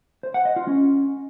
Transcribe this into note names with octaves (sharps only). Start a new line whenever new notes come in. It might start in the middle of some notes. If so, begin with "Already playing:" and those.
C5
F#5
D#5
F4
C#4